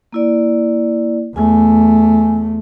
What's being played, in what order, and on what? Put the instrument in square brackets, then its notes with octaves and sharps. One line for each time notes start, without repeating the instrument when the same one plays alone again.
[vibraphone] A#3 E4 D5
[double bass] E2 A3 [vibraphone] G#5